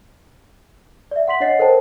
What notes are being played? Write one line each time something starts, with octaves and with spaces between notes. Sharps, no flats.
D5 E5
F#5 C6 B6 F#7
D4 C#5 D#5 F#5 A6 C7
A4 A#4 C5 G5 A5